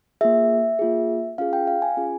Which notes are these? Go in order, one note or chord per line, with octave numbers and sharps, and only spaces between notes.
A#3 F4 G#4 E5
A#3 F4 G#4
C#4 F4 G#4 F5
G5
F5
G#5
C#4 F4 G#4